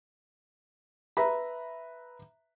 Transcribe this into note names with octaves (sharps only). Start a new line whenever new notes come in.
B4 E5 A#5 B5